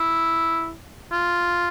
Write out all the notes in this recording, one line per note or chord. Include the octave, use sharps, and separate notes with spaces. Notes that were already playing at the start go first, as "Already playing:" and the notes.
Already playing: E4
F4